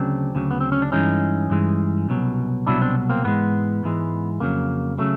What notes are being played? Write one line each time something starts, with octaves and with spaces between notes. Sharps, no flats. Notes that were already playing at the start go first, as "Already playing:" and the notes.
Already playing: D2 C#3 F#3 C4 D4
D2 C#3 F#3
B3
C4
C#4
D4
G2 E3 G#3 C#4 D#4
G2 E3 G#3
C2 B2 F#3
C2 B2 F#3 D4 E4
C4 D4
A#3 C4
G#2 E3 G#3 A3 B3
G#2 E3 G#3
F2 C#3 F#3 A#3
C#3 F#3 A3